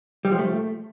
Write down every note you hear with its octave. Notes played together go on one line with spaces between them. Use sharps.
G3
F3
A3